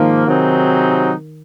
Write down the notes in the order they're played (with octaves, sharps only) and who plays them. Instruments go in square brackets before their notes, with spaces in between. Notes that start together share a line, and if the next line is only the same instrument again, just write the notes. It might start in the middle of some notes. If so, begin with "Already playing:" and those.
Already playing: [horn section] G#2 F3 A#3 [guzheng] D#3
[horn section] C3 F#3 C4 D#4 G#4